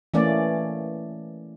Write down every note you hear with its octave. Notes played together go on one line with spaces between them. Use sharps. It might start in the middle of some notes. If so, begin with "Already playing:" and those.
E3 A3 A#3 C#4 D5